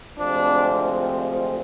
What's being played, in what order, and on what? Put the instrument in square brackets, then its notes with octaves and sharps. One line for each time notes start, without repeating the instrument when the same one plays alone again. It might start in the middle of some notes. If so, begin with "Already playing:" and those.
[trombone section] D2 C3 F3 G#3 C4 D4